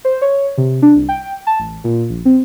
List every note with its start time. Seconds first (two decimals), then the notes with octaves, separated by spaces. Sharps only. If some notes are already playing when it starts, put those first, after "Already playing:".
0.05 C5
0.22 C#5
0.58 C3
0.82 D4
0.95 C2
1.09 G5
1.47 A5
1.59 A1
1.84 A#2
2.10 A#1
2.25 C4